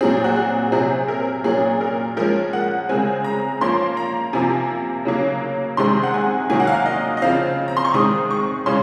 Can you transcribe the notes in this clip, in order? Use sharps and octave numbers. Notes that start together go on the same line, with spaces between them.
A#2 F#3 C4 G#4
F#4
G#4
C3 F#3 C4 G#4
A#4
A#2 F#3 C#4 G#4
A#4
F3 G#3 C#4 A#4
F#5
C#3 G#3 C4 G#5
A#5
F3 A#3 C#4 C6
A#5
C3 F3 A#3 G#5
C#3 F#3 A#3 C#4
C3 D#3 G#3 C4 C6
F#5
G#5
D#3 F#3 A#3 G#5
F#5
F5
D#5
D#5
C#3 F3 C4 F5
A#5
C6
C#6
D#3 G#3 C4 D#6
C#6
C#3 G#3 C#4 C6